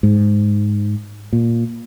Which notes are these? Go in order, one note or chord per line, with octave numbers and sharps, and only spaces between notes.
G#2
A#2